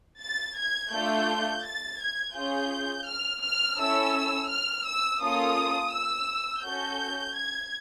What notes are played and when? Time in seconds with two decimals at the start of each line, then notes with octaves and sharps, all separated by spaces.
0.22 A6
0.58 G#6
0.93 A3 D4 F4 A4 G6
1.65 A6
2.01 G#6
2.36 C#4 F4 G#4 G6
3.07 F6
3.43 F6
3.78 C#4 E4 A4 E6
4.50 F6
4.86 E6
5.21 A#3 C#4 F4 A4 D#6
5.93 E6
6.64 C#4 F#4 A4 G6
7.36 G#6